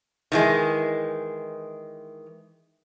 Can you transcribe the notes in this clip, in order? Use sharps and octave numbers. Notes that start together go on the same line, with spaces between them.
D#3 E3 G#3